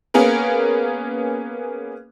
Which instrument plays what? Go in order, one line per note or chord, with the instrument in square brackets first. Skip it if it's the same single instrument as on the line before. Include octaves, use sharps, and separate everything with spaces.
[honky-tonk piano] A#3 B3 C#4 G#4 A#4